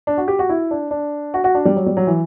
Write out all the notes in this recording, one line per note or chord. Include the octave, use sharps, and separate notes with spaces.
D4
F#4
G4
F#4
E4
D4
D4
F#4
F#4
D4
G3
F#3
G3
F#3
E3